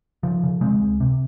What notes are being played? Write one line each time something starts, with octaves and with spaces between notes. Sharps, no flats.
C#3 F3
C#3
C#3 G#3 C4
C#2
C3